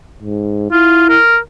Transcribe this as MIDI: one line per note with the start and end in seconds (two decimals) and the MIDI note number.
0.22 0.66 44
0.71 1.19 64
0.71 1.06 65
1.09 1.38 70